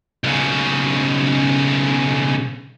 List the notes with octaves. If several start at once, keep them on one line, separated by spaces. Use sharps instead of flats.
B1 C#3